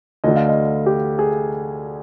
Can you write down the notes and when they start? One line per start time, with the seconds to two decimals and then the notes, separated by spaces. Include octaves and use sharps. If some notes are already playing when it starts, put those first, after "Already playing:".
0.24 D2 D3 D#5
0.36 F5
0.49 D#5
0.86 G4
1.19 G#4